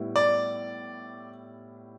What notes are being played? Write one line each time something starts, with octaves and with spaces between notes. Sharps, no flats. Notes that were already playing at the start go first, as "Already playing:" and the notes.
Already playing: A2 G3 B3 E4
D5